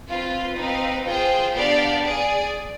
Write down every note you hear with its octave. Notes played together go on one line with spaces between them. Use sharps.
C4 F4 B4
C4 D#4 B4 F5
F4 G#4 C5 G5
B3 D4 G4 D5 F5
G#4 D5 G#5